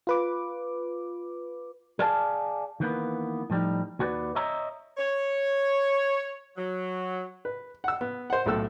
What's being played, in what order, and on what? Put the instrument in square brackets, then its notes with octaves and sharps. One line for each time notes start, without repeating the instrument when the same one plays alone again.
[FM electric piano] F4 B4 D6
[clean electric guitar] G#4 D5 F5 G#5 A5
D#3 E3 A#3 B3
A2 F3 G3 D#4
D#2 F#4 B4 D5
C#5 D#5 E5 A#5
[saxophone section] C#5
F#3
[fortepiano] B4
F#5 E6
B3
C5 F#5
B1 A2 A4 E6